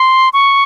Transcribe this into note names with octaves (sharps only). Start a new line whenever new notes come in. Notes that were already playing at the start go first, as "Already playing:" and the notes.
Already playing: C6
C#6